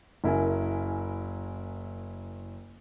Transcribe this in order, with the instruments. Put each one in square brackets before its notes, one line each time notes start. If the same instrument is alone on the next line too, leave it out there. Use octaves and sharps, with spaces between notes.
[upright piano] F#1 E4 A#4 G#5